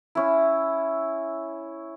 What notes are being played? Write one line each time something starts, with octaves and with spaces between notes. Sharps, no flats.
C#4 E4